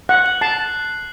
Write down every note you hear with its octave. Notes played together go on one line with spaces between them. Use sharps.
F#5 F#6
F#7
A5 C7